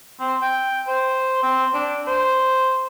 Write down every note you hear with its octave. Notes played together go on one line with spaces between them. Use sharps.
C4
G5
C5
C4
D4
C5